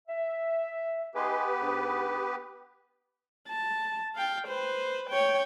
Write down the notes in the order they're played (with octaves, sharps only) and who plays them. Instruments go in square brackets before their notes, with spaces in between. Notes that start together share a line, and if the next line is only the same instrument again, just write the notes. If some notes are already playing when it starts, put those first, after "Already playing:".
[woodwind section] E5
[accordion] B3 G4 B4 [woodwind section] D#4 G#4 C6
[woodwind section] G#2 D4
[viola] A5
F5 G5
B4 C5
C#5 G5